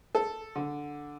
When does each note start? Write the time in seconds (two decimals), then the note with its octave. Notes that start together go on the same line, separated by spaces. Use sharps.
0.15 A4
0.56 D3